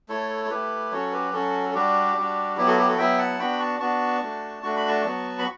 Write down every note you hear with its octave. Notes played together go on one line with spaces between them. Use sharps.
A3 E4 A4 C#5
A4
A3 E4 G4 B4
F#3 C#4 F#4 A4 C#5
G4 B4
F#3 C#4 F#4 A4
A4
G3 D4 F#4 G4
G3 D4 F#4
F#3 B3 E4 G4
F#4 A4
G4
F#4 A4
F#3 B3 E4 E5 G5
F#5 A5
B3 D4 F#4 G5 B5
A5 C#6
B3 D4 F#4 A5 C#6
A3 D4 F#4
A3 D4 F#4 C#6
B5
A5 C#6
F#3 B3 F#4
B5